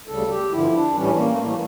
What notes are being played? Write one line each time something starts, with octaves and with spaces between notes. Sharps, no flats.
D2 C#3 G3 A4
G4
G2 D3 F3 E4
D4
A2 E3 G3 C#4
A#3
A3
A2 E3 G3 A#3